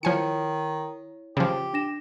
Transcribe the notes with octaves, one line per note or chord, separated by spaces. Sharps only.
D#3 F3 E4 C#5 G#5 C#7
C#3 F3 G4
D4 A#6 E7